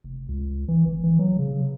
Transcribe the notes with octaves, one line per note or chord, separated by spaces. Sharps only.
F1
C#2
E3
G1
E3
F#3
C#3